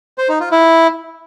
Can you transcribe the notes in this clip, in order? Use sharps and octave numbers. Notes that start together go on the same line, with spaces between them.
C5
D#4
F4
E4